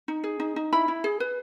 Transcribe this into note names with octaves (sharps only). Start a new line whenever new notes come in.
D#4
G#4
D#4
D#4
E4 B5
E4
G#4
B4